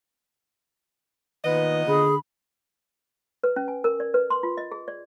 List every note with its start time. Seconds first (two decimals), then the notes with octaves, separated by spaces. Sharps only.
1.45 A#2 D#3 B3 B4 D#5
1.88 D3 G#4 B5
3.43 B4
3.56 C#4
3.68 G#5
3.84 A#4
4.00 D5
4.14 B4
4.30 C6
4.43 F4
4.57 D#5
4.72 G#4
4.88 D5